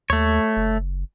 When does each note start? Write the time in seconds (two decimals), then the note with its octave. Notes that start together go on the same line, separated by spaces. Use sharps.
0.10 D#2 A3 C#5
0.57 F#1